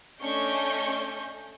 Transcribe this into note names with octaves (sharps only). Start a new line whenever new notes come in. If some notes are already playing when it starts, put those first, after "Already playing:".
A3 C#4 D4 D#5 C#6 G6